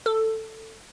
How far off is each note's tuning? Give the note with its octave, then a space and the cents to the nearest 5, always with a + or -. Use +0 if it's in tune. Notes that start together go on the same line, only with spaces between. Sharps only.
A4 +10